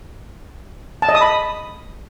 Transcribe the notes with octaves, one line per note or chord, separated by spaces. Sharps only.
A5
D#5
D#6
B5